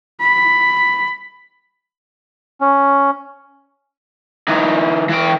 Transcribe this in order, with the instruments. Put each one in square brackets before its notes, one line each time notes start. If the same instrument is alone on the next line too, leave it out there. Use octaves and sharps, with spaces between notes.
[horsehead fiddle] B5
[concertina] C#4
[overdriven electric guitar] E3 D#4
E3 G5